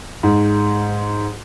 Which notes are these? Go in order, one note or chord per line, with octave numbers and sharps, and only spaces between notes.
G#2